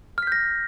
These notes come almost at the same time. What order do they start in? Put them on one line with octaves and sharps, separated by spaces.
F6 B6 G6 A#6